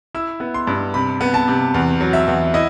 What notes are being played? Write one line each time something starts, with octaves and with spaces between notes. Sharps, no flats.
E4 E6
B3
C6
G2
C3 B5
B3
A5
C3
E2
F#3
E5
E2
E4 D#5